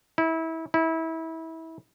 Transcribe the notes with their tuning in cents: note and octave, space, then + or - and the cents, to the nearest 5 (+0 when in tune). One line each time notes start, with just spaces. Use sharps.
E4 -25
E4 -25